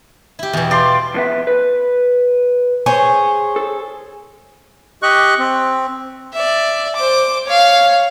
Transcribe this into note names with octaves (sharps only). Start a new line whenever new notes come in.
E4 G4
E2 B2 G5
F4 D5 C6
F2 B3 E5
B4
G#4 C5 C#5
A4
G4 D#5 C#6 F#6
C4
D5 E5
C5 D6
C#5 F5